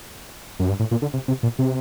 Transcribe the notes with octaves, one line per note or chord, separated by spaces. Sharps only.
F#2
G2
A2
A#2
D3
C3
C3
A#2
C3